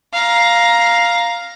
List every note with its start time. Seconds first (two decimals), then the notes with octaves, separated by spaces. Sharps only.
0.13 F5 A#5